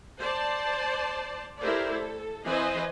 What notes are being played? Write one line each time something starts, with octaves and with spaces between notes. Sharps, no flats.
C5 D5 A5
A3 E4 G4 A#4 C5 D5
A4
E3 C4 B4 C5 D#5 G#5